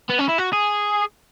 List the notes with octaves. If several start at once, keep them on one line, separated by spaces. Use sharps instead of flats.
B3
C#4
E4
F#4
G#4